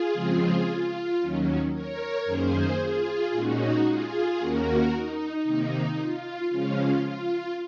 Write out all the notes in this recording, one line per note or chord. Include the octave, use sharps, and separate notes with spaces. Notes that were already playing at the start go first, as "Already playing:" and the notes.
Already playing: F4 G#4
C#3 F3 G#3 C4
F4
D#2 D#3 F#3 C#4
A#4 C#5
F#2 D#3 A#3 C#4 G#4 C5
F4 G#4
A#2 G#3 C#4 D#4 F#4
F4 G#4
D#2 D#3 A#3 C#4 F#4 A#4
D#4
C3 D#3 A#3 D#4
F4
C#3 F3 G#3 C#4 F4
F4